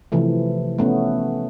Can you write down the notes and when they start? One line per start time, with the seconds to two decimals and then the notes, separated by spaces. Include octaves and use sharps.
0.12 C3 E3 F3 A3
0.78 A3 B3 C#4